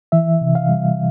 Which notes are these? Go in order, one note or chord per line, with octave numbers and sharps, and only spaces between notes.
E3 E5
C3
F5
G3